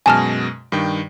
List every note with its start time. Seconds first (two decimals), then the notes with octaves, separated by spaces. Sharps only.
0.06 F#2 B2 G#3 G#5 A5 F6
0.72 G2 D#3 G5